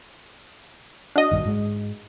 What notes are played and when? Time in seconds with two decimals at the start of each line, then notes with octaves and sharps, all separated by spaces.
1.16 D4 F#4 D#5
1.31 A#1 G2 D#3
1.45 G#2 G#3